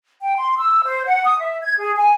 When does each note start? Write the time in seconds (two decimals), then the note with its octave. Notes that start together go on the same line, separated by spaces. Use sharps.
0.22 G5
0.37 C6
0.59 E6
0.84 C5
1.05 F#5
1.24 D#6
1.40 E5
1.62 G#6
1.78 G#4
1.97 G#5